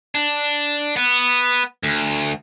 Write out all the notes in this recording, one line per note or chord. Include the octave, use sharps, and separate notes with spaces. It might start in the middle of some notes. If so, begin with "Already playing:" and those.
D4
B3
D2